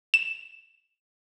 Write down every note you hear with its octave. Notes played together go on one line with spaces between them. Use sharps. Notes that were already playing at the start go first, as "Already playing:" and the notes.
E7